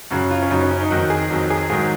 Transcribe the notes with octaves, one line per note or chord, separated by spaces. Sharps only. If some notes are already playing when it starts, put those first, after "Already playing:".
F#2 C#3 F#3 F#4
F4
C#4
F#2 C#3 F#3 D#4
C#4
C#4
D#4
F2 D#3 F#3 F#4
G#4
F2 D#3 F#3 F#4
G#4
G#2 D#3 F#3 G#4